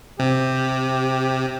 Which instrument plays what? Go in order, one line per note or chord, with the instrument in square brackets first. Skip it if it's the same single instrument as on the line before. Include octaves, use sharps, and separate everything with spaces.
[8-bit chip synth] C3 [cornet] G4